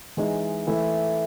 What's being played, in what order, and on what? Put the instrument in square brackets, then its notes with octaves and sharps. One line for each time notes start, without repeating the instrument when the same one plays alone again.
[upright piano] E3 G#3 D#4
E3 A3 E4